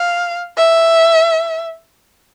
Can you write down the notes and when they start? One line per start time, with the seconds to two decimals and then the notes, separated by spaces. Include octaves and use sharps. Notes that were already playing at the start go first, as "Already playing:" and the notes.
Already playing: F5
0.57 E5